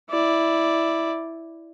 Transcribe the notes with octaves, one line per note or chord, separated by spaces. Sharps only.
E4 D5